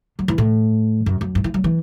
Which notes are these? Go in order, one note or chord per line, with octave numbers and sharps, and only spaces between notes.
F#3
E3
A2
F#2
F#2
G2
E3
F#3
E3